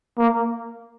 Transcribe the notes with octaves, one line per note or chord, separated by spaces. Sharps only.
A#3